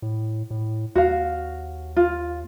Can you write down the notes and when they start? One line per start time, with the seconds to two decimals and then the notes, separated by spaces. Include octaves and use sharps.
0.02 A2
0.51 A2
0.95 D#2 F#4 F5
1.96 F4